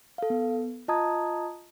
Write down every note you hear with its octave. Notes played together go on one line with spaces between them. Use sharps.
A4 F5
B3
F4 D#5 A5 A#5 D#6 G#6